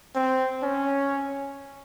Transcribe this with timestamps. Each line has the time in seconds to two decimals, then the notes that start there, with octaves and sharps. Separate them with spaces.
0.16 C4
0.62 C#4